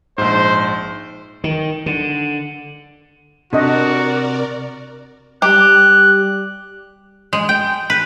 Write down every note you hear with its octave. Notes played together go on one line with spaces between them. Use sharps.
A#1 G#2 C5
D#3
D3
C3 D4 F#4 A4 A#4 D5 D#5
G3 G4 F#6
G#3
G5
B4